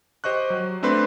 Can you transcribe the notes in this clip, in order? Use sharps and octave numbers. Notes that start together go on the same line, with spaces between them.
G4 C5 D#5 C#6 F#6
F#3
A3 C4 D4 B4 C6